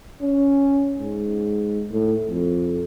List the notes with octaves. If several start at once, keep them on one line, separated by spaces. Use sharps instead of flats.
C#4
G#2
A2
F2